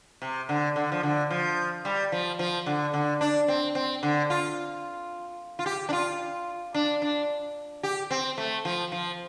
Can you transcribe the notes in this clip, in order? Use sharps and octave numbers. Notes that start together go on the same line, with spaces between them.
C3
D3
D3
F3
D3
F3
G3
F3
F3
D3
D3
D4
C4
C4
D3
F4
F4
G4
D4
F4
D4
D4
G4
C4
A3
F3
F3